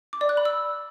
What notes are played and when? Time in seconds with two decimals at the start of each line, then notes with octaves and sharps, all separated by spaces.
0.13 D6
0.21 D5
0.29 F#6
0.37 B5
0.45 E6